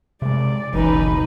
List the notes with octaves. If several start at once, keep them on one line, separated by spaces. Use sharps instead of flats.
C3 G#3 D5
F#1 C#2 B2 E3 F#3 D#4 B4